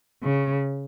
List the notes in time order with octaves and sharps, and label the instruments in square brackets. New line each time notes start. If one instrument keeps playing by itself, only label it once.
[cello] C#3